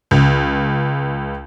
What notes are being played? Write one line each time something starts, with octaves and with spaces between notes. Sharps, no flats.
C#2